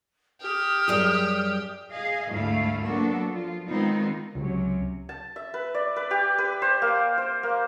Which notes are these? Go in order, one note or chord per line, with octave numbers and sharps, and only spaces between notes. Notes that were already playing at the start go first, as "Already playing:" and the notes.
G4 D#6 F6
F#2 G3 G#4
G#4 D#5 F5
D2 G#2 A3 E4 F5
F#3 A#3 B3 D4 F#4 A4
F3 F4
D#3 G#3 B3 C4 D#4 F4
C#2 C3 F#3 C#4
A5
E5
B4
D5
B4
G4
B4
C5
A#3
C5
A#3